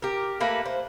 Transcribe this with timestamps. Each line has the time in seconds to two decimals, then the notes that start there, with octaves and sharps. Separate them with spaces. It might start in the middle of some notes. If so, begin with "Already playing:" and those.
0.02 G4 A#4
0.40 A3 A#3 B4
0.66 C5